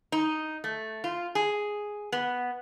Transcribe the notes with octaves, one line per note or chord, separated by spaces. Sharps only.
D#4
A3
F4
G#4
B3